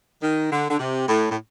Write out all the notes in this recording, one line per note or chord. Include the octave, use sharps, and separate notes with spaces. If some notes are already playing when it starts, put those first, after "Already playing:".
D#3
D3
D3
C3
A2
A2